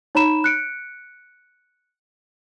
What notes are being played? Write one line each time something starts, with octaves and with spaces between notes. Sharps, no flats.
D#4 C#5 A#5 B5 E7
F#6 C#7 D7